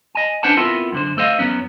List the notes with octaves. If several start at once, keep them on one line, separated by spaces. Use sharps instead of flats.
D#5 G#5
C#4 D4 B4 C5 F#5 A5
B3 C4 E4 F4 A4 A#4
F#2 D3 C5
A3 A4 C5 D#5 F5
F#2 B2 F#3 B3 C#4